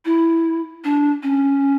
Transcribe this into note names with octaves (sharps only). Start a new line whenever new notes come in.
E4
D4
C#4